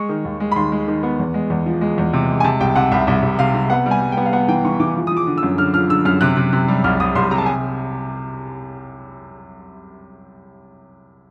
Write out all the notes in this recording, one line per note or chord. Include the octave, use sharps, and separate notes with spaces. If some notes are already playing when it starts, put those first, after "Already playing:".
Already playing: G#3 C#6
D#3
D#2
G#3
B5
D#2 C6
G#3
D#3
B3
E2
G#3
E2
F3
G#3
E2
C3
G#3
G#5
C3 A5
C2 G5
C3 F#5
C2 E5
C2 E5
C2
C3 F5
C3
B3 F#5
G3
G#5
G3
G5
B3
F5
B3 F#5
E3 G5
E3 C#6
E3 D6
F3
F3 D#6
D6
D3
E6
F#2
D3 F6
F3 F6
D3 E6
F#2 F6
C3 F#6
C3
C3
G3
C2 F6
C2 D#6
C2 C6
C3 A#5
A5
G#5